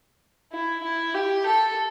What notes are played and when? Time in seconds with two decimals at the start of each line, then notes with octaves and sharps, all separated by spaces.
0.52 E4
0.83 E4
1.14 G4
1.46 A4